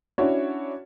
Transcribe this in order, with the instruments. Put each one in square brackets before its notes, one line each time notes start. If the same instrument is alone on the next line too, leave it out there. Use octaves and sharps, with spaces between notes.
[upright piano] C#4 D4 E4 F#4 C#5